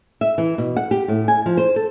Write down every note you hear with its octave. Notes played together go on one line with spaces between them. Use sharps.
E5
E3
B2
F#5
G4
A2
G#5
F3
C5
A4